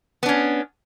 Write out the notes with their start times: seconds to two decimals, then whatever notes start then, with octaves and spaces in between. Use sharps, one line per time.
0.23 B3
0.26 D4
0.29 C#4